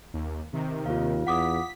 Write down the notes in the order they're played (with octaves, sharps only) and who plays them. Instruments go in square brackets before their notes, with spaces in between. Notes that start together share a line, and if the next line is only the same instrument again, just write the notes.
[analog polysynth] D#2
C3 D#3
[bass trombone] D#2 [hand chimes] F4 F5
[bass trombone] E2 [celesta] F#5 D6 D#6 [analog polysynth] B6